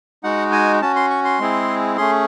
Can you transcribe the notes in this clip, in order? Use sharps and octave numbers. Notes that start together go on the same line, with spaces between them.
G#3 D#4 F#4 F#5
G#5
C#4 F#4 A5
C6
C#6
C6
G#3 C4 E4 G#4
A3 C#4 G#4 C6